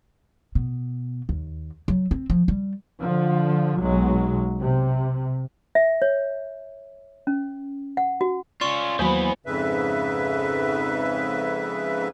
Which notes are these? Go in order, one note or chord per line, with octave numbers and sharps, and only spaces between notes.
B2
D#2
F#3
C4
F3
G3
D3 F3
B1 F#3 G#3
C3
E5
C#5
C#4
F#5
F#4
C#4 F4 D5 C6 C#6
D#2 E3 F#3 A#3 B3 C5 G#5 B5
F2 G#2 C#3 B4 E5